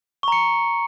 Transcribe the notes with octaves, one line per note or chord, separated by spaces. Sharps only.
A#5 C#6 C#7